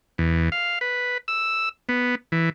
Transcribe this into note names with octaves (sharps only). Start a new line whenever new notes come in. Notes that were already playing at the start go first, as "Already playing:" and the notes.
E2
F5
B4
E6
B3
E3